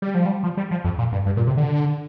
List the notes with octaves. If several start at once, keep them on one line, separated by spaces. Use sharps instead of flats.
G3
F3
G3
F3
G3
F3
F2
A#2
G2
G2
A#2
C3
D3